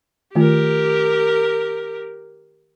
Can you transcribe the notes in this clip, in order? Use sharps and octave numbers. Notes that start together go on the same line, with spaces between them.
D#3 A3 F4 G4 A#4